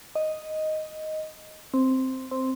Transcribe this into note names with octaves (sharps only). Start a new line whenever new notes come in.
D#5
C4
C4